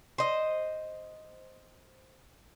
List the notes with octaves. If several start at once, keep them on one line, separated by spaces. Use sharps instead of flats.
C5 D#5